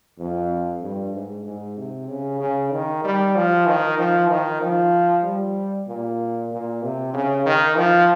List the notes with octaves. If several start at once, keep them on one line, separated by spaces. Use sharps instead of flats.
F2
G2
G#2
G#2
C3
C#3
C#3
D#3
G3
F3
D#3
F3
D#3
F3
G3
A#2
A#2
C3
C#3
D#3
F3